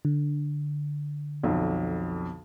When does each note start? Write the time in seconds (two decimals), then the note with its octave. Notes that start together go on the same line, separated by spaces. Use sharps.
0.05 D3
1.43 B1 F2